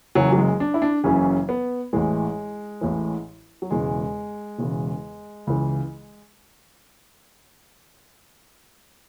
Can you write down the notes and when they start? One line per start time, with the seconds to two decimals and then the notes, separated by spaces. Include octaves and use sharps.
0.15 F#1 F#2 C#3 E3 F#3
0.33 F#3
0.38 G#3
0.60 D4
0.74 E4
0.82 D4
1.04 F#1 F#2 C#3 E3 C#4
1.49 B3
1.93 A1 A2 E3 G#3
2.81 A1 A2 E3
3.62 F#3
3.71 E1 E2 C#3 E3 G#3
4.59 E1 E2 C#3 E3
5.47 C#2 C#3 E3